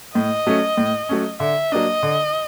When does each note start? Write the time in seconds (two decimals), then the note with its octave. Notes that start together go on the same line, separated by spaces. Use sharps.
0.15 A2 D#5
0.47 F#3 A3 C#4
0.77 A2
1.09 F#3 A3 C#4
1.40 D3 E5
1.72 F#3 A#3 D4 D#5
2.03 D3